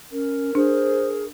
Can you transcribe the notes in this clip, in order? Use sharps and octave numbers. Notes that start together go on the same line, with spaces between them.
C#4 A#4
D4 G#4 C5